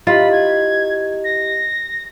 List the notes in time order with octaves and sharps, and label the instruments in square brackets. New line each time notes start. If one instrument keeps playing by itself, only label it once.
[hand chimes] E4 G4 D#5 [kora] F4 [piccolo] B5
[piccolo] G#6
A#6